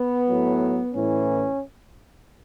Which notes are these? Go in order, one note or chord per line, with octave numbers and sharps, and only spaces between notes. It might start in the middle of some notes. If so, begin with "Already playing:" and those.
Already playing: B3
A2 F#3
A2 E3 C#4